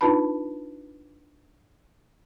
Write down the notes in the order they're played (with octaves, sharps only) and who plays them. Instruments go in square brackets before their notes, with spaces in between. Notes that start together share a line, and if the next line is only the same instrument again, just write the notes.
[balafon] D4 D#4 F4 B4 A5 B5